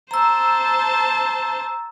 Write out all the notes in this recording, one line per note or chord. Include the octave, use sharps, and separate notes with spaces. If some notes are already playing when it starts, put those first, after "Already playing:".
C5 A5 A#5 E6